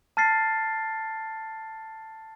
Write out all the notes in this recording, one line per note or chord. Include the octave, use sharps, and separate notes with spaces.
A5 F6 A6 C7